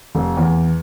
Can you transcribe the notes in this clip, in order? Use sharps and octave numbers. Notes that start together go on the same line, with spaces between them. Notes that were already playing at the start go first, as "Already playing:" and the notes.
F1
E2